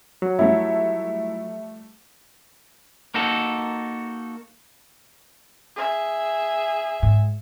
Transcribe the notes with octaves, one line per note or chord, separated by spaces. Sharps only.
F#3
F3 G3 A3 E4 E5
A#3 D#4 F#4 A4
G#4 E5
G#2